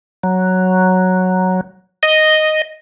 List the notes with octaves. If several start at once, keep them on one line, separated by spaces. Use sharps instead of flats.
F#3
D#5